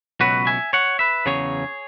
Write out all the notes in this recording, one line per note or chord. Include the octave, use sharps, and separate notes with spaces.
C#2 B2 F#3 F#4 B4
E5 G#5
C#5 F#5
B4 E5
E2 C#3 F#3 G#4 C#5